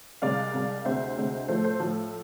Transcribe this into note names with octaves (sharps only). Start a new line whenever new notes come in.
C2 C3 G#3 D5 F5
C2 C3 G#3
D2 C3 G#3 C4 C5 E5
D2 C3 G#3 C4
A2 F3 A3 A4 C5
A4 C5
A2 F3 A3 A4